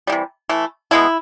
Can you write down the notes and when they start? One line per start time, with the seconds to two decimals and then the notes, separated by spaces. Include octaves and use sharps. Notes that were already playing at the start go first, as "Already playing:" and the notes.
0.07 C3 E3 G3
0.49 E3 A3
0.91 B2 G#3 B3 E4